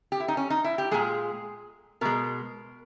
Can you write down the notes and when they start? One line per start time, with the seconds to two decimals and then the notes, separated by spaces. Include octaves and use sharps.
0.12 G4
0.20 E4
0.28 D#4
0.37 C#4
0.50 D#4
0.64 E4
0.78 G4
0.91 A#2 G#3 G#4
2.01 B2 G#3 A#4